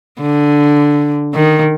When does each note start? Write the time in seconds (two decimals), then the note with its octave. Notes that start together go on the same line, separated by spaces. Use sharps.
0.20 D3
1.34 D#3